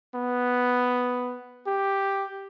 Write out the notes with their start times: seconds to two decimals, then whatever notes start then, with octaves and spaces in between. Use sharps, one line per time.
0.15 B3
1.67 G4